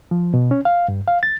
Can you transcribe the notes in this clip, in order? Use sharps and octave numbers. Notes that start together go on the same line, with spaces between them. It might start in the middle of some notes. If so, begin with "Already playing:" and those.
F3
B2
C#4
F5
G2
F5
A6